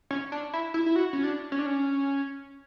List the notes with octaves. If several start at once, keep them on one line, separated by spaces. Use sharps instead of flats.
C#4
D4
E4
E4
E4
F#4
C#4
D4
C#4
D4
C#4